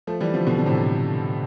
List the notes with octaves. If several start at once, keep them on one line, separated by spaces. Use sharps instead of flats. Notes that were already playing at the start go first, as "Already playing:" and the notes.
F3 A3
E3 G3
D3 F3
B2 D3
D3
A2 C3